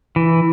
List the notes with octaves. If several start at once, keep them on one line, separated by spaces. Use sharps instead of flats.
E3